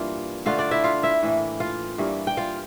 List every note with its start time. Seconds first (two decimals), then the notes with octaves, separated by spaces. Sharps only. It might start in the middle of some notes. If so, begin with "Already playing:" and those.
Already playing: G2 E3 A#3 F4
0.46 D3 A3 D4 F4 F5
0.59 D4 D5
0.71 E4 E5
0.84 F4 F5
1.03 E4 E5
1.23 A2 E3 A#3
1.60 F4 F5
1.98 G2 E3 G3 A#3
2.27 G5
2.37 F4 F5